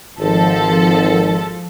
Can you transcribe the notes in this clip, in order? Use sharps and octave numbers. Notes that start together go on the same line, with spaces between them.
G#1 F3 A4